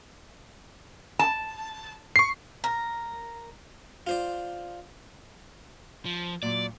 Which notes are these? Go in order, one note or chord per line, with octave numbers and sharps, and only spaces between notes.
A5
C#6 C7
A#4
F4 C5 D5
F3
A#2 F#3 D5